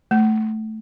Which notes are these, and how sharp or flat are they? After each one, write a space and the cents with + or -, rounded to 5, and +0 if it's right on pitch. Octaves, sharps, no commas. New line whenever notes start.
A3 -10